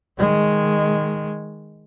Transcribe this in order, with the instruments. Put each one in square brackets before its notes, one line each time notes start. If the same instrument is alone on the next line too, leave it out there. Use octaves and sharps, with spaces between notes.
[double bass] D#3 G#3